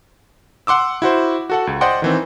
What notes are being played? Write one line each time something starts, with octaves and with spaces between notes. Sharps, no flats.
F#5 C6 D6 E6
E4 F#4 C5
F#4 A4 F#5
C#2
C5 D5 D#5 F#5 G5 C6
D#3 E3 C4